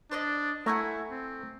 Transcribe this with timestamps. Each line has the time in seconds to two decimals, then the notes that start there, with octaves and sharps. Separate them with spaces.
0.11 D4 C5 D5 D#5
0.66 A3 E4 F#5 G#5 A#5
1.11 C4